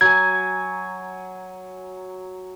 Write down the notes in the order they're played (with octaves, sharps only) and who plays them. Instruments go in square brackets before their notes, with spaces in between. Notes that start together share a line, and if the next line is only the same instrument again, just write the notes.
[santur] F#3 G#5 [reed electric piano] G#6